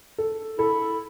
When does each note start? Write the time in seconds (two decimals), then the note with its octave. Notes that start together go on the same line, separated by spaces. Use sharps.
0.18 A4
0.59 E4 A4